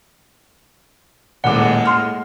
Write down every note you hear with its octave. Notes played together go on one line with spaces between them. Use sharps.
D#1 A2 G#3 A#3 F#5 D6
C6 F6